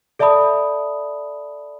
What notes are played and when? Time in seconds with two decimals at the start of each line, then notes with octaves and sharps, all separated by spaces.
0.19 A4 D5 E5 A5 B5 D#6